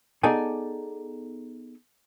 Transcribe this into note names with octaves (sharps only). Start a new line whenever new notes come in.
B3 D#4 G#4 A4 D5 G#5